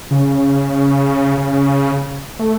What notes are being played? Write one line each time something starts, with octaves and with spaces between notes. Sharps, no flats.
C#3
C#3
A3